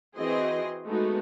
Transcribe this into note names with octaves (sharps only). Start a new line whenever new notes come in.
E3 C4 F#4 G#4 D#5 C6
G#3 A3 B3 D#4 F#4